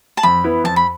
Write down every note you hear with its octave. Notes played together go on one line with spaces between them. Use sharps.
A5
F2 B5
E3 B3 E4 B4
F2 A5
B5